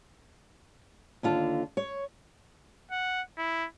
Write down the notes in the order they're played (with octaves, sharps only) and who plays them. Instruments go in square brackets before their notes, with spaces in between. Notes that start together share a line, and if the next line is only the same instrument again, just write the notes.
[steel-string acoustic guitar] D#2 D3 F4 A5
C#5
[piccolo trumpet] F#5
E4